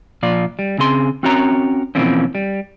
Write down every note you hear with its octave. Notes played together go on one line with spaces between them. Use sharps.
A#2 F3 F4 D5
G3
C#3 C4 G#4 C6
C4 C#4 F#4 A#4 C#5 A#5
B2 E3 F3 A#3 C4 C#4
G3